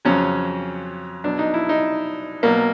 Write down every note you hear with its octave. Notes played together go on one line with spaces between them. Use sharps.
F2 C#3 F#3 C#4
B2 F#3 D4
D#4
E4
D#4
B2 F#3 A#3